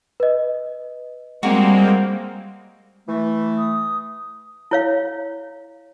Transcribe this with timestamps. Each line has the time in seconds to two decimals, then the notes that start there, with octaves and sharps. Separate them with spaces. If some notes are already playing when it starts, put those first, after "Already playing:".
0.20 B4 D#5
1.43 G3 G#3 A#3 C4 F#4
3.08 E3 A3
3.58 D#6
4.71 E4 C#5 F5